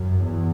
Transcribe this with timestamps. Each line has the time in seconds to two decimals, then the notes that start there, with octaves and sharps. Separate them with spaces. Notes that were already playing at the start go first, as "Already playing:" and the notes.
Already playing: F#2
0.23 E2